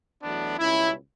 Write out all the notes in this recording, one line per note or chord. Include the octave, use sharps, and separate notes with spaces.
E2 B2 F#3 A3 B3 D4
C#2 B2 G3 C#4 E4